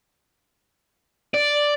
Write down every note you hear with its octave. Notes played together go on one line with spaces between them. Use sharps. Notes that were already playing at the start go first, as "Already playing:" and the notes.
D5